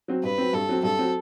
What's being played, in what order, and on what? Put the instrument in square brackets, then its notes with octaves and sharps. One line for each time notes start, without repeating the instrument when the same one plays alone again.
[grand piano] F#3 C4
[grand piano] G2 [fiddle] B4
[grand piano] F#3 C4
[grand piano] G2 [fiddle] A4
[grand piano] F#3 C4
[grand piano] G2 [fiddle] A4
[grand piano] F#3 C4